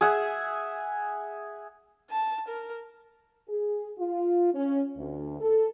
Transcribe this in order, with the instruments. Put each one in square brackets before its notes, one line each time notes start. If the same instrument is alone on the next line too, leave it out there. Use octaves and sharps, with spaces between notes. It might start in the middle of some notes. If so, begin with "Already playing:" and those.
[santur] G#4 E5 F#5
[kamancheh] A5
A#4
[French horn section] G#4
F4
C#4
D2
A4